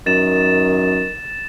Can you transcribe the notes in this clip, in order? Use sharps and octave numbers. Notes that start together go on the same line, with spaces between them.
F#2 D#3 A6 E7